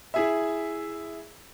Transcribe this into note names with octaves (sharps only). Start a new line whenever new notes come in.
E4 G#4 E5